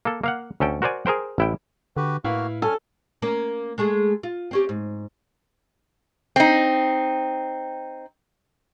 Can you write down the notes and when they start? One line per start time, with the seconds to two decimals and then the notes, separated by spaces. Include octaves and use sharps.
0.05 A#3 A4
0.24 A#3 F5 F#5
0.60 D2 C#4 A4 G5
0.82 F#4 A#4 C5 D5 G#5
1.06 G#4 A#4 C5 G5
1.38 A1 E4 G5
1.97 D3 F#4 G4 B4
2.24 A2 A#3 E4 F#4 B4 F5 F6
2.62 C#4 A4 G#5 F6
3.22 A#3 C#4
3.78 G#3 A3 G#4
4.23 F4
4.51 C4 C#4 G4
4.69 G#2
6.36 C4 D#4